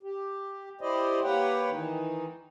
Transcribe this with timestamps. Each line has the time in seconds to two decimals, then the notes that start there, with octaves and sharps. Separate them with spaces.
0.03 G4
0.81 E4 G4 C5 D5 D#5
1.23 A#3 G4 B4 C#5 F#5 G5
1.71 D#3 E3 D#4